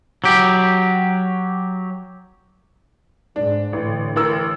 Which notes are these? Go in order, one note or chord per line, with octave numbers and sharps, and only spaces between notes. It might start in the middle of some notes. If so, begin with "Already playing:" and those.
F#3 G4
G#2 D4
A1 A2 D3
A1 A#4 E6